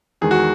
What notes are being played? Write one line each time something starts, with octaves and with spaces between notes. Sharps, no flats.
E2 D#3 G#3 G#4
F#4